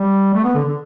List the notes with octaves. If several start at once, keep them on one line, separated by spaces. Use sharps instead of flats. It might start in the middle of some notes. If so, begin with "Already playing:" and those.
Already playing: G3
A3
B3
D3
D3